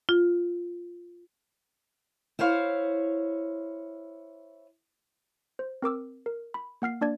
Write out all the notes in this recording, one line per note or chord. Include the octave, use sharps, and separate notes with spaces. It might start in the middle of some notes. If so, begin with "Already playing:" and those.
F4
E4 C5 C#5 F5
C5
C4 A#4 D6 E6
A#4
B5
A#3 F#5 F6 C7
A#3 D4 D5 G#6